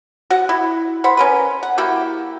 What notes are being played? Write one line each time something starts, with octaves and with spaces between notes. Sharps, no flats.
F#4 F#5
E4
C5 F#5 B5
C#4 A#4 B4
F#5
A#3 E4 F#4 G4